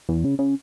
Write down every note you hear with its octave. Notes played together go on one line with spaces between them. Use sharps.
E2
C#3
C#3